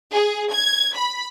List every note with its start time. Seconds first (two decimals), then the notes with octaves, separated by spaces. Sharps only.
0.12 G#4
0.52 G#6
0.94 B5